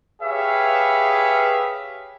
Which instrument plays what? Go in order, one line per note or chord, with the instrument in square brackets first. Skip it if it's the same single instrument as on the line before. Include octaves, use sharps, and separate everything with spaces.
[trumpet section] G4 G#4 B4 C#5 E5 F5